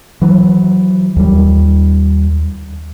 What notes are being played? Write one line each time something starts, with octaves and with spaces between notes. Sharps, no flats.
E3 F#3
D#2 G3